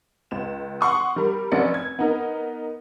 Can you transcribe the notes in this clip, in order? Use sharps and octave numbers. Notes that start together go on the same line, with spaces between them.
C#2 E7
F#5 C6 C#6 D#6
G3 A#4 B5
F1 F#3 C#4 F#4 D5 C#7
G#6
B3 D#4 A#4